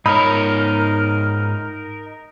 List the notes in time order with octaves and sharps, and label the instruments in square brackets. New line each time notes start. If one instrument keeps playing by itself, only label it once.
[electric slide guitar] G#2 C#5 [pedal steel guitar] D#4 A#4 [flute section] A#5 F6 [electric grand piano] B5